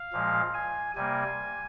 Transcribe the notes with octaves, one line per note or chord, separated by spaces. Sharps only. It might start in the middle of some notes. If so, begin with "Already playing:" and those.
Already playing: F5
A#2 F3 G#3
G#5
C3 G3 A#3 G#5